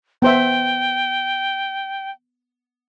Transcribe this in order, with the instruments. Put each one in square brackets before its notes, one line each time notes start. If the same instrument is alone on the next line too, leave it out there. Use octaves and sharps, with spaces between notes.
[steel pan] B3 C5 E5 [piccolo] G5